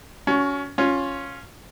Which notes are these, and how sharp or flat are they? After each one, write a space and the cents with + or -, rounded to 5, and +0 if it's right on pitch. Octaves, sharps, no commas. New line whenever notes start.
C#4 +25 F#4 +0
C#4 +0 F4 +10